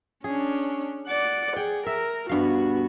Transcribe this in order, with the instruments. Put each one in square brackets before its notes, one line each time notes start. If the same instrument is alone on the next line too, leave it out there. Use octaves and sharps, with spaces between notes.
[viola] C#4 D4 [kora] G#4
[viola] D5 F#5
[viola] G#4 [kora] G5
[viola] A#4 [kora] E5
[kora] G2 F5 [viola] B3 F#4